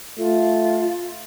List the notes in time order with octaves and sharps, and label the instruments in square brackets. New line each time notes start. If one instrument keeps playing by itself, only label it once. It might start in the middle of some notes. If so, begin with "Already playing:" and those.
[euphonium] A3 [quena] F4